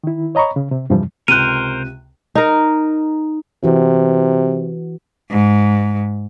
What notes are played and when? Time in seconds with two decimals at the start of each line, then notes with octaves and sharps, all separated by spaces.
0.04 D#3 E4
0.35 C#5 D#5 A#5 B5 C#6
0.56 C#3
0.71 C3
0.90 E2 G2 C3 E3 F3 G3
1.28 C#2 C3 A#4 C5 F#6 D#7
2.35 D#4 A#4
3.64 C3 E3 F#4
5.31 G#2